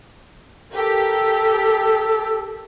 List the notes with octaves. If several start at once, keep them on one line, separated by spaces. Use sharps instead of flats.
G4 A4 A#4